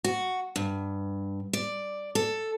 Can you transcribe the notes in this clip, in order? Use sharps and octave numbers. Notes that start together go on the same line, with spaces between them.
F#4
G2
D5
A4